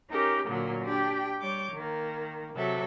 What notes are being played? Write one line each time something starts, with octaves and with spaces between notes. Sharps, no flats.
C#4 D#4 G4 A#4
A#2 D3 F#3 A#3
D4 G4 G5
G3 C#5 D6 G6
D#3 A#3
C3 F#3 A4 E5